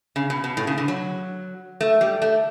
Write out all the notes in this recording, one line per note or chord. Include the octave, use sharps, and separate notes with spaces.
C#3
B2
B2
A2
C#3
D3
F#3
A3
G3
A3